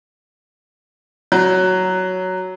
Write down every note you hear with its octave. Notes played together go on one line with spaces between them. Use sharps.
F#3